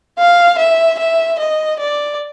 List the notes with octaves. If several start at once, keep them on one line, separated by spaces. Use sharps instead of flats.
F5
E5
E5
D#5
D5